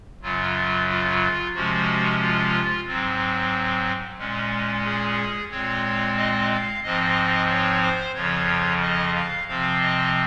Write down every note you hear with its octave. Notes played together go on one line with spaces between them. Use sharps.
F#2 C#3 F#3 F4
F4
C3 F3 G#3 C#4 F#4
F4
G#2 F#3 C4
A#2 G#3 C#4
G#4
A#2 G#3 C4 C#5
D#5
F5
G#2 F3 C4 D#5
C#5
C5
F2 C#3 F3 C#5
D#5
F5
C3 F3 C4 F5
D#5